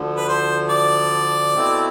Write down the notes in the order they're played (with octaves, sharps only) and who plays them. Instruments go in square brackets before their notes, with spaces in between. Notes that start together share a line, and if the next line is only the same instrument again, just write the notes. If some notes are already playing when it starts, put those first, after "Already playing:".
Already playing: [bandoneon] D2 D3 F3
[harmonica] B4
C5
D5
[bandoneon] B2 A3 C4 E4